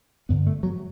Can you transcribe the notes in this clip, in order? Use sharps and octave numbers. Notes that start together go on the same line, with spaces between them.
G2 D3 B3
A3
F#3